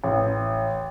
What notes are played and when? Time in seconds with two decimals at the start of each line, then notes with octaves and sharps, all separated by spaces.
0.04 A1